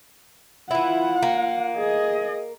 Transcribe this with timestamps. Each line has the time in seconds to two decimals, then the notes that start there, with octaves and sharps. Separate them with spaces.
0.71 E3 E4 F4 F#5
1.23 A#3
1.77 G#4 D#5